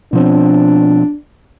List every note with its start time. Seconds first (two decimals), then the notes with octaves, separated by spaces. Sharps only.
0.13 B2 F3 C4 D4